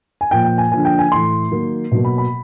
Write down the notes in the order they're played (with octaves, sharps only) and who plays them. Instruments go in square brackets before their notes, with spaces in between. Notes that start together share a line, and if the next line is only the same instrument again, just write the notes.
[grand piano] G#5
A#2 F3 A#3 G5
G5
G#5
D3 F3 A#3 G#5
G5
G#5
A2 E3 A3 C6
D#3 F#3 A#3
B2 F#3 A#3
B5
B5